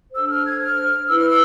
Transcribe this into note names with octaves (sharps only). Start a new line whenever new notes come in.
D4 A4 C5 E6
F6
G#6
F6
E4 B4 E6
F6
E6